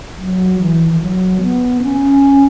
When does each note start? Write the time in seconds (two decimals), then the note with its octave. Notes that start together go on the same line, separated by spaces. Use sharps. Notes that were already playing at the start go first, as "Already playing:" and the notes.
0.19 F#3
0.60 E3
0.90 E3
1.00 F#3
1.42 B3
1.83 C#4